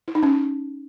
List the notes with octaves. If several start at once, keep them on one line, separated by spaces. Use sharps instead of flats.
E4
D#4
C#4